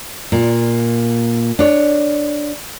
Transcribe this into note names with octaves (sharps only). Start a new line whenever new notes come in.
A#2
D4 C#5